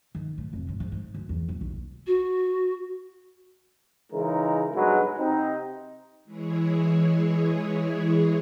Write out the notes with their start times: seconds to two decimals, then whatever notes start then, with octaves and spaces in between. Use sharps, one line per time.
0.15 D#3
0.38 A2
0.53 F1
0.69 G#2
0.80 G#2
0.92 G#2
1.15 D2
1.29 E2
1.49 D#1
1.61 B1
2.07 F#4
4.13 C#3 E3 G#3 D#4 A#4
4.75 B1 G2 F#3 G#3 B4
5.19 C3 C4 D#4
6.24 E3 G#3 E4 G#4 C#5